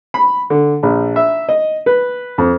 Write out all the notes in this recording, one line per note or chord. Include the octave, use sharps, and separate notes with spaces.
B5
D3
A#1
E5
D#5
B4
F2